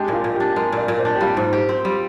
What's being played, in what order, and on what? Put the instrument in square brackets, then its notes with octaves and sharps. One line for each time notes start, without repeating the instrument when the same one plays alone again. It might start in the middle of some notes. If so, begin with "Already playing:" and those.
Already playing: [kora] G#3 D4 [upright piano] G4
[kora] A#2 [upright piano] F4
[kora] A#2
[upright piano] G4
[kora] D4
[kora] G#3 [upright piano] A#4
[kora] A#2 [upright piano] D5
[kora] A#2
[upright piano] C5
[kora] D4
[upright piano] G4
[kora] G3 [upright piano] F4
[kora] G#2
G4
C4
G3